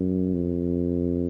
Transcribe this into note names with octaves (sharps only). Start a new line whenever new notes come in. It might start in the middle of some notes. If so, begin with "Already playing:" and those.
Already playing: F#2
F2